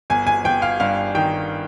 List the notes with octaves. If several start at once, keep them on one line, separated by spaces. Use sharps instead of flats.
G1 G#5
G#5
G1 G5
F5
G2 F5
D#3 G5